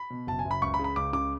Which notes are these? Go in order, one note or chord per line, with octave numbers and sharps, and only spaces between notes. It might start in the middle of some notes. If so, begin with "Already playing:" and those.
Already playing: B5
B2
F#1 A5
G#5
F#1
B5
C#2 C#6
B5
C#3
B5
C#2 D6
C#3 D6